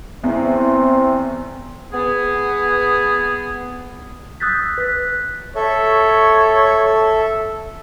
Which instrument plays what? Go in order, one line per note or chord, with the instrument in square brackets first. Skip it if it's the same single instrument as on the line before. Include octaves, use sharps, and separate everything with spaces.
[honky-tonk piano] E2 [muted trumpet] C4
[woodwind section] B3 G#4
[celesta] D#6 E6 F#6 G6 A6 B6
B4 F#6 B6
[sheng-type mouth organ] A4 E5 [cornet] C#5